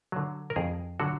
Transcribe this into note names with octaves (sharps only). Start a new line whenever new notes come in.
D3 F#3
A#4
F2 G#4
D3 F#3 F#4